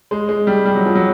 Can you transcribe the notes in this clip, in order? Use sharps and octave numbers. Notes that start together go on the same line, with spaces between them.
G#3
G#3
G3
G3
F#3
F3
F#3